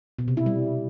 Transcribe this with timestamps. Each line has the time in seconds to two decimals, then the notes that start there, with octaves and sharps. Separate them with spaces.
0.19 B2
0.28 C3
0.37 E4
0.46 G3